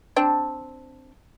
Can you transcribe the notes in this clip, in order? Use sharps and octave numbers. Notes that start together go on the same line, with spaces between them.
C4 D4